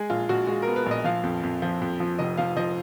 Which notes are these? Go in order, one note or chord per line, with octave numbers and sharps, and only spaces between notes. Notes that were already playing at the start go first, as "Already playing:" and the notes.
Already playing: G#3 G#4
A#1 F4
A#1 F#4
G#3 F#4
A#4
B3
B4
A#1
D#5
F3 F5
F2
F2
F3
F2
F3
F1 D#5
F3 F5
F3 D#5